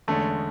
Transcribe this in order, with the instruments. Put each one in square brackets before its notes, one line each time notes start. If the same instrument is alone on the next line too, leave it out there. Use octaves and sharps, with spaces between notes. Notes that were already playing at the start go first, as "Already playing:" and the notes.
[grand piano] E2 D3 G#3 C#4 [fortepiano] A3